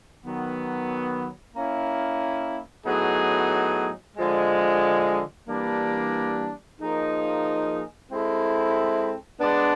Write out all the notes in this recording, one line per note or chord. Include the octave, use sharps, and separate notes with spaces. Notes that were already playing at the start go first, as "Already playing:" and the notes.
D#3 F#3 B3
A#3 C#4 E4
A2 F#3 B3 D#4 G#4
D3 F3 G#3
E3 G3 A#3 D4
F3 A#3 D#4 G#4
G#3 C4 E4 A4
G#3 B3 D4